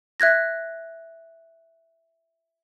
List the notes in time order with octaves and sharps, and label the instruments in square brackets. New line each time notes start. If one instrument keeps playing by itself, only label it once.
[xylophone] E5 F#6 G#6 A#6